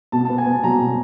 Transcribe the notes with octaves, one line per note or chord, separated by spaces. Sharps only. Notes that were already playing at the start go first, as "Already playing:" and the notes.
B2 A5
B3 A5
G#5
B3
A5
F#3 A#5
B2